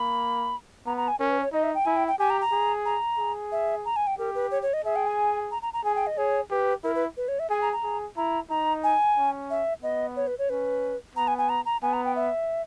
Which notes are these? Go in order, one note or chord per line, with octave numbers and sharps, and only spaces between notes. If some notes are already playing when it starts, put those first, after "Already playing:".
Already playing: A#3 B5
B3 A#5
A#5
G#5
C#4 A#4
B4
C#5
D#4 D#5
E5
G5
E4 G#5
G5
G5
G4 G#5
A#5
A#5
G#4
A#5
G#4
E5
A#5
G#5
G5
G4 A#4
B4
C#5
C#5
D#5
G#4 E5
G5
G#5
A#5
A#5
A#5
G#4 G#5
G5
D#5
G#4 C#5
G4 B4
E4 A#4
B4
B4
C#5
E5
G#4 G#5
A#5
A#5
G#4
E4 A#5
D#4 A#5
G#5
C#4
E5
B3 D#5
C#5
B4
C#5
C#4 B4
B3 A#5
G#5
G#5
A#5
A#5
B3 G#5
A#5
G5
E5